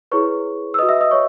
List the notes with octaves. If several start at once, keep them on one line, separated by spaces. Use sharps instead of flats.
E4 G#4 B4 C#5 C#6
E6
F#4 B4 D#5 D#6
E5 E6
D#5 D#6
C#5 C#6